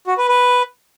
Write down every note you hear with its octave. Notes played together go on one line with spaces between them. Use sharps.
F#4
B4
B4